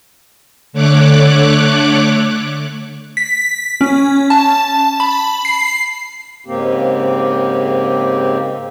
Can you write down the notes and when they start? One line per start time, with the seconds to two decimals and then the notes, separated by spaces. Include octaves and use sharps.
0.73 D3 A3 C#5 D6 F#6
3.17 B6
3.81 C#4
4.30 A5
5.00 B5
5.45 C7
6.46 G#2 C#3 A#3 C4 G4